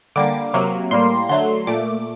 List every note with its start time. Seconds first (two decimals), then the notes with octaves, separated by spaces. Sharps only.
0.16 D3 G3 A#3 D6
0.54 C3 F#3 A#3
0.91 A2 G3 A#3 C6
1.29 D3 F#3 A3 C6
1.67 A#2 A3 D6